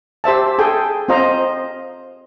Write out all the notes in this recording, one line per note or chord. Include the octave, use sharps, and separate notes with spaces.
G4 C5 E5 A5
G#4 A4 G5
C4 F4 C5 D#5 A#5